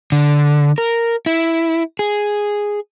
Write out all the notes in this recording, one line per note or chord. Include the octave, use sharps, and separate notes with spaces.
D3
A#4
E4
G#4